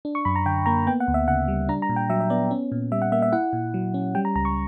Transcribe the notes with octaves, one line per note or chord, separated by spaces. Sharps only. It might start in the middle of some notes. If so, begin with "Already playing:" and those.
D4
C#6
F#2 B5
A#5
D3 G5
A#3 A#5
B3 G5
F#5
D2
E5
C#3 F#5
G3
D4 A#5
A#5
A#2
G5
F#3 E5
E5
B3 D5
C#4
A#2
G3 E5
F#5
A#3 E5
E5
E4 F#5
A#2
F#3
C#4
G3 G5
A#5
C#2 A#5
C#6